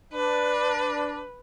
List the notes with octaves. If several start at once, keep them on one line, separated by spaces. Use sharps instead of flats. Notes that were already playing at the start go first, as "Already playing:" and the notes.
D4 B4